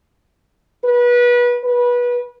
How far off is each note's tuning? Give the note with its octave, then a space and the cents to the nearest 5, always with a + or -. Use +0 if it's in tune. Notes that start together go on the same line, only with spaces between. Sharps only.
B4 -25
B4 -25